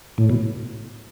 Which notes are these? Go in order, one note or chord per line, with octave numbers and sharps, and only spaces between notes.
A2
B2